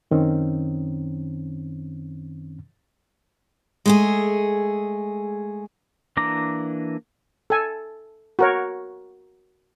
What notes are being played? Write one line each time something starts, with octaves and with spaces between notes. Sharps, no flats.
F#2 D#3 C4 C#4
G#3 A3 G#4
E3 A#3 D4 A#5 D6
A4 G#5
F#4 A#4 C#5